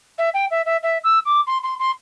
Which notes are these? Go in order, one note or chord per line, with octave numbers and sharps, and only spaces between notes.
E5
G5
E5
E5
E5
E6
D6
C6
C6
C6